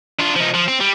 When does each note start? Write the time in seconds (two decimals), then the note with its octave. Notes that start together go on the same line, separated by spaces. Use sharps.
0.19 D4 F4
0.35 F3 D#4
0.54 F3
0.68 C4
0.80 G3